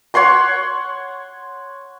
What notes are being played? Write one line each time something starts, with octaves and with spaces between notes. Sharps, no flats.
C#5 F#5 C6 C#6